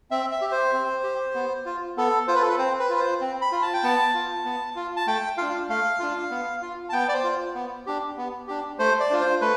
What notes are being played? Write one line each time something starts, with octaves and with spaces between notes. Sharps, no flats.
C4 E5
E5
G4
C5
C4
G4
B3
F4
B3 A4
F4 C5
B4
A4
B4
C4 C5
B4
F4
B4
C5
C4
B5
F4
A5
G5
B3 A5
F4
B3
F4
A5
A3 G5
D4 F4 F5
A3 F5
D4 F4
B3
F4
A5
B3 G5
D5
C5
F4
B3
D4 G4
B3
D4 G4
A3 C5
D5
D4 F4
C5
A3 B4